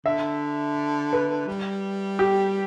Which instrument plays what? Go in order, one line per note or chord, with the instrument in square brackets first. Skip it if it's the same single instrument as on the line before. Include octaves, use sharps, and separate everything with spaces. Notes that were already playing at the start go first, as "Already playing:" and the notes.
[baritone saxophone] D3 [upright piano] E5
[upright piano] B4
[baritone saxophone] G3
[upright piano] G4